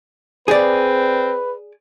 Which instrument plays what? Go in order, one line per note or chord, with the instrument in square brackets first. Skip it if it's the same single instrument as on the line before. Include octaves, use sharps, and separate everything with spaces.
[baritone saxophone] C4 [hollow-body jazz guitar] G#4 D5 [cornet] B4